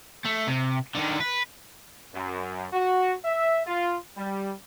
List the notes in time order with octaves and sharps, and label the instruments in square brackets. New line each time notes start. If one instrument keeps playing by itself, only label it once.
[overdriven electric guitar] A3
C3
D3 D#3
B4
[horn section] F#2
F#4
E5
F4
G3